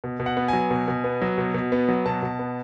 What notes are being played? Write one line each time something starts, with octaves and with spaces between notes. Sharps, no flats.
B2
B2
F#5
B3
F#3 G#5
B2
B2
B3
F#3
B2
B2
B3
F#3
B2 A5
B2
B3